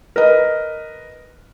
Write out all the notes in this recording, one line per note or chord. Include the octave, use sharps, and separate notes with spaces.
A#4 B4 D#5